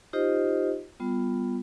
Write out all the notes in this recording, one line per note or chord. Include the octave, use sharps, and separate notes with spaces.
D#4 F4 G4 C5 D#5
G3 B3 F4